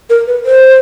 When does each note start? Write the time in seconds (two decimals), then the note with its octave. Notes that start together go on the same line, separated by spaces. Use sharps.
0.10 A#4
0.27 B4
0.45 C5